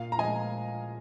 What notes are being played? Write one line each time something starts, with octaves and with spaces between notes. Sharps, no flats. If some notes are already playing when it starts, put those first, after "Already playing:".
Already playing: A#2 F5
A#5
F3 G#3 D#5 G#5